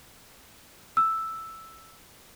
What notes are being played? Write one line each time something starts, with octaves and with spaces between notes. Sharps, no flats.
E6